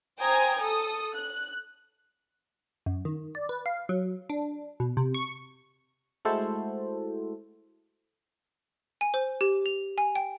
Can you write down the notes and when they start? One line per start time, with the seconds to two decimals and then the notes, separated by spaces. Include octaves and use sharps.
0.18 C5 G5 G#5 A#5 D#6 G#6
0.59 A4 D#6
1.15 F#6
2.86 F#2
3.05 D#3
3.35 D5
3.49 B4
3.66 F5
3.89 F#3
4.30 D4
4.80 B2
4.97 C3
5.14 C#6
6.25 G#3 A3 E4 F#4 A4 C5
9.01 G#5
9.14 C5
9.41 G4
9.66 F7
9.98 G#5
10.15 G5